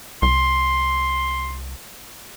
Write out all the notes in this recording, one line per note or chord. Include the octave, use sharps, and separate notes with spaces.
C2 C6